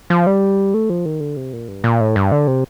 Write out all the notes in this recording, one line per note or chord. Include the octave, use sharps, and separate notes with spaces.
F3
G3
A3
F3
D#3
D3
C3
A#2
G2
A#2
A2
G2
D3
C3